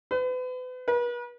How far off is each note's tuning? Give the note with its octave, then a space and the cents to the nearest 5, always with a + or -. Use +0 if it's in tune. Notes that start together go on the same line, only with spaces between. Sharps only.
B4 +40
B4 -40